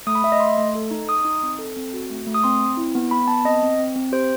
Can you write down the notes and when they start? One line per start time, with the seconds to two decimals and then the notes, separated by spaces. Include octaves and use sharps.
0.07 A3 D#6
0.15 B5
0.23 A3 E5
0.32 D#5
0.40 A3 C6
0.58 A3
0.75 A4
0.91 D#4
1.08 D#4 D#6
1.25 D#4
1.43 C4
1.59 A4
1.77 C4
1.93 F#4
2.10 A3
2.27 A3
2.34 D#6
2.44 C4 C6
2.60 C4
2.77 E4
2.95 B3
3.11 B3 B5
3.28 B3 A5
3.45 C4 D#5
3.63 C4
3.79 C4
3.96 C4
4.12 G4 C5